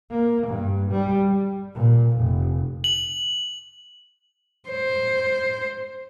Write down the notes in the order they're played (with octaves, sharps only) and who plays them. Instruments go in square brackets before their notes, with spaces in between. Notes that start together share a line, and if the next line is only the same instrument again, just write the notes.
[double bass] A#3
G2
G3
G3
A#2
F1
[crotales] F#7
[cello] C5